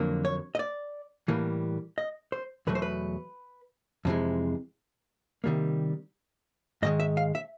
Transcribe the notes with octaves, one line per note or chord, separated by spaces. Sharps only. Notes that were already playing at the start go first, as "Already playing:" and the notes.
Already playing: F2 D3 F#3 A#3
C#5
D#5
D5
A2 E3 G3 A#3
D#5
C5
E2 B2 F#3 A3 B4
C5
B4
F2 C3 E3 G#3
C3 D#3 G3 A#3
G#2 D#3 G#3 D#5
E5
F5
E5